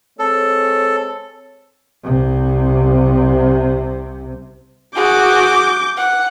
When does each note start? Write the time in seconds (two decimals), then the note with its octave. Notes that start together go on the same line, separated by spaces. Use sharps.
0.19 G#3 C4 A4 C#5
2.04 C2 C3
4.95 F#4 G#4 D6 G6
5.97 F#5